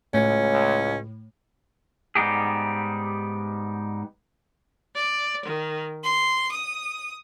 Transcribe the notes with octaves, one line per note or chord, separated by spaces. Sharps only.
C#2 A2 C#4
G#2 G3 B3 D#4 G4 G#4
D5
D#3
C6
D#6